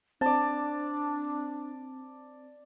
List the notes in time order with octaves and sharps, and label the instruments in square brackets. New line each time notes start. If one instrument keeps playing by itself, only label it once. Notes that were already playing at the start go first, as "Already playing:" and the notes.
[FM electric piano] C4 [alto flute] D4 [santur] D5 A5